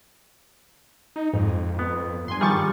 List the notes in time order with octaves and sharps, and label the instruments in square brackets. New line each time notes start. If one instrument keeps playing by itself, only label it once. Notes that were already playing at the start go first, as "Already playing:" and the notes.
[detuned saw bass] D#4
[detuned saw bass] F2 [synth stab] G#2
[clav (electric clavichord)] B3
[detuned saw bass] G2 [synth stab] G#5 C6
[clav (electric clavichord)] D#3 F3 G3 [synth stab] G#4 C#6 A6